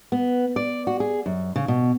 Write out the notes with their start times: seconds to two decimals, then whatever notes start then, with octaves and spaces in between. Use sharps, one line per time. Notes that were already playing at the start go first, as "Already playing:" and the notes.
0.12 B3
0.56 D5
0.87 F#4
1.00 G#4
1.26 F#2
1.56 C#3
1.68 B2